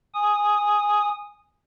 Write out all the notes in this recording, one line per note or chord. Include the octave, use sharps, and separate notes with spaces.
G#5 D#6